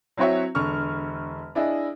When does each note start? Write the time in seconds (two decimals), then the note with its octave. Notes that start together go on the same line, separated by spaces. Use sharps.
0.17 F#3 C4 E4 F#4 C#5 E5
0.55 E1 D3 C#6 F6
1.55 D4 E4 G#4 D#5